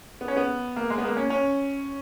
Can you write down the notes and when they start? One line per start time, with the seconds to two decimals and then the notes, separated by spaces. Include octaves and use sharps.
0.21 B3
0.28 C#4
0.37 B3
0.76 A#3
0.90 G#3
0.98 B3
1.04 A#3
1.17 C#4
1.30 C#4